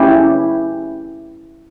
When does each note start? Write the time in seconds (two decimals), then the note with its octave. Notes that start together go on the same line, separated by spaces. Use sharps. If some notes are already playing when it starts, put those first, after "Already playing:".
Already playing: C#4 E4 G4